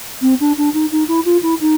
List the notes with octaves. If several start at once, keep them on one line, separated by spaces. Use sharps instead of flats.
C4
D4
D4
D#4
D#4
E4
F4
E4
D#4